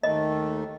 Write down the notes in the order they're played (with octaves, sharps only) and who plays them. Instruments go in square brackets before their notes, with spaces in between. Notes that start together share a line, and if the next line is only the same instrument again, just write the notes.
[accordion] D#2 D#3 A3 [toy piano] D#5